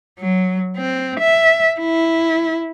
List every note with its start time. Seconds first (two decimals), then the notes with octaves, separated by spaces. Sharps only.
0.19 F#3
0.77 C4
1.20 E5
1.80 E4